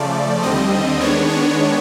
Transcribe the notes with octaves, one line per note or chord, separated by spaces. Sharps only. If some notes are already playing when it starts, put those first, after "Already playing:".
Already playing: C#3 F3 A3 D5
D#2 D3 G3 C4 D#5
D#3 G#3 B3 D4 C#5
C#5